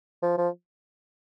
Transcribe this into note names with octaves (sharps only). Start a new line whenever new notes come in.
F3
F3